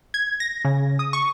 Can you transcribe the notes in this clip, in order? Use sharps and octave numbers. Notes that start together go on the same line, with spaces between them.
G#6
A#6
C#3
D#6
C#6